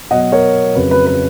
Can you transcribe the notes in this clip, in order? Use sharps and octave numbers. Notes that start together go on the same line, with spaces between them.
B2 F#3 D#5 F#5
A#4 C#5
F2 C#3 F#3 B4
B4
B4